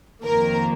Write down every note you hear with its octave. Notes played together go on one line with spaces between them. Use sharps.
F2 D#3 A#3 A#4